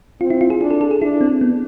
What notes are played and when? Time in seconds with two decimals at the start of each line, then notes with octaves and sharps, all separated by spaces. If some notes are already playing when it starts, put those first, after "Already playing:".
0.20 C4 F4
0.30 E4
0.41 F4
0.50 G#4
0.61 D4 G#4
0.71 A4
0.81 A4
0.91 G#4
1.02 D4 E4
1.21 C4
1.41 B3